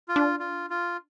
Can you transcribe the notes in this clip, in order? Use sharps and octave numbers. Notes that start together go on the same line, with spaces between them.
F4
D4
F4
F4